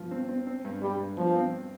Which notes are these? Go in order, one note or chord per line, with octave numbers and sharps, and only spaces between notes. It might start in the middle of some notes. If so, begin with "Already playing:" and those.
Already playing: G2 F3
C4
C4
C4
G2
G2 G3
G2
G2 F3
C4